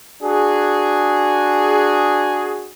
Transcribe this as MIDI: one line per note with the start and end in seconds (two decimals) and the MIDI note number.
0.22 2.72 62
0.22 2.72 66
0.22 2.72 68